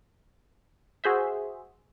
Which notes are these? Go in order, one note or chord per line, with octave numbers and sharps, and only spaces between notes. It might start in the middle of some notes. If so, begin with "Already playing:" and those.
F#4 G#4 C5 E5